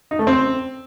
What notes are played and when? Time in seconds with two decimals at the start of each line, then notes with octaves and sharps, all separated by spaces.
0.11 D#4
0.19 A3
0.27 C4